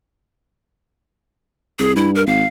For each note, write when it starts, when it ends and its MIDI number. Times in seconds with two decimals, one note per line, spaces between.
1.79 1.96 36
1.79 1.92 68
1.96 2.23 43
1.96 2.10 64
2.15 2.23 70
2.27 2.44 32
2.27 2.47 77